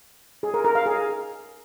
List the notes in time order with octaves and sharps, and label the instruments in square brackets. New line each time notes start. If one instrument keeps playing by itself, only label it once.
[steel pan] G#4
A#4
A#4
F5
G#4